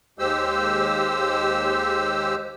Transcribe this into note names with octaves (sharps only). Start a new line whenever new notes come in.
D#2 G#3 G4 C5 E6